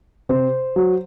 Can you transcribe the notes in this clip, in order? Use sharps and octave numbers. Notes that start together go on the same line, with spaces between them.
C3 C5
F#3